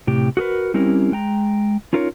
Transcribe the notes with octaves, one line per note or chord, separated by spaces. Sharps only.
A2 C3 G4
F#4 G#4 A#4 B4
G3 C4 C#4 E4 G4 A#4
G#3 G5 A#5
C#4 D#4 F4 A#4 B4 C#5